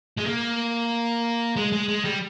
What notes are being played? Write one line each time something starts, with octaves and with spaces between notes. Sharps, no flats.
G#3
A#3
G#3
G#3
G#3
G3